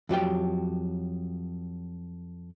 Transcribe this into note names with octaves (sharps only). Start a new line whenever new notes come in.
F2 F#3 G4 G5